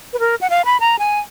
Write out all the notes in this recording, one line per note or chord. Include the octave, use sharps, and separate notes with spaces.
B4
A#4
F#5
F5
B5
A#5
G#5